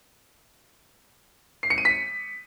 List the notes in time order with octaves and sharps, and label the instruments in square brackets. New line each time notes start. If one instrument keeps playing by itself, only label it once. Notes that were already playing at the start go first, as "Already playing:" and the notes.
[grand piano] C7
C#7
D#7
B6